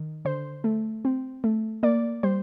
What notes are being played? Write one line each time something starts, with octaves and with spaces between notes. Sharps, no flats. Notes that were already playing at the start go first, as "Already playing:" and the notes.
Already playing: D#3
D3 C5
A3
C4
A3
A#3 D5
G3 C5